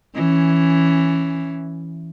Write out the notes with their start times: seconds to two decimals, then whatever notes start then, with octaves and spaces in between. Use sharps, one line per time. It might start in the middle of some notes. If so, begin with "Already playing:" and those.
0.16 E3 C#4